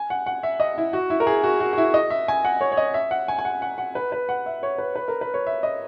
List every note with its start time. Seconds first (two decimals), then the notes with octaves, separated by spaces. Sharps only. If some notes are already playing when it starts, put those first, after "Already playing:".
Already playing: G#5
0.10 F#5
0.26 F#5
0.43 E5
0.60 D#5
0.78 E4
0.93 F#4
1.10 E4
1.20 A#4
1.27 G#4
1.44 F#4
1.60 F#4
1.73 F#4
1.78 E4
1.94 D#5
2.10 E5
2.28 G#5
2.45 F#5
2.61 C#5
2.72 C#5
2.77 D#5
2.94 E5
3.11 F#5
3.28 G#5
3.39 G#5
3.45 F#5
3.62 F#5
3.78 F#5
3.95 B4
4.12 B4
4.29 F#5
4.46 E5
4.63 C#5
4.78 B4
4.95 B4
5.08 A#4
5.21 B4
5.34 C#5
5.47 E5
5.63 D#5